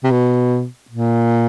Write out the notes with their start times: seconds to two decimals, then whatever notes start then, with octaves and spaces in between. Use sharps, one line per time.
0.04 C3
0.11 B2
0.90 A#2